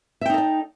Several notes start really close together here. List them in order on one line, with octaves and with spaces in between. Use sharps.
E5 G5 D#4 A4 D#5